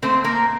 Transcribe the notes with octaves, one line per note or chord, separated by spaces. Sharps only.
A#2 A3 C4 C5
A#3 A#4